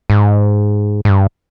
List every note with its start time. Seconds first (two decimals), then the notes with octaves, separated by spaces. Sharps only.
0.10 G#2
1.05 G#2
1.09 G2